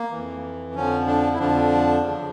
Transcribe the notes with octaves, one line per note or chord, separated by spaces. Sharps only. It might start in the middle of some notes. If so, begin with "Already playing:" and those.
Already playing: A#3
F2 E3
F2 D3 F3 C#4
D4
E4
F2 D3 F3 D4
E2 C#3 F3